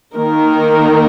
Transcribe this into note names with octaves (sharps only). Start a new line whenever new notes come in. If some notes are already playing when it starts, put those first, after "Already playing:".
D#3 A#3 D#4 A#4